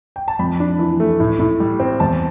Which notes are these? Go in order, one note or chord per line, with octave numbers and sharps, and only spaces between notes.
G5
A5
F2 B5
D4
E3
A3
A2
A2
G3
C4
E2 A5